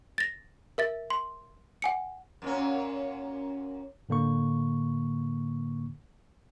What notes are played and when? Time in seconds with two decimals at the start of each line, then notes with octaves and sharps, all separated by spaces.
0.18 A6 A#6
0.78 A#4 E5 A6
1.10 C6
1.82 F#5 G#5 C#7
2.42 F#2 A#2 C#4
4.09 A2 D3 A#3 C#6